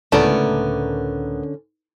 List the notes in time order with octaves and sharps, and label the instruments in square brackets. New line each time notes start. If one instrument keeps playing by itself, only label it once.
[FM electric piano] C#2 A2 A#4 [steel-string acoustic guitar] D3 C#4 [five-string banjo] A3 B3 D5